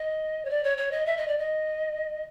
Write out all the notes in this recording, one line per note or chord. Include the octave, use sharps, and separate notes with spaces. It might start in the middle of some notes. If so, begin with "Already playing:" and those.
Already playing: D#5
C#5
D5
C#5
C#5
D#5
E5
D#5
D5
D#5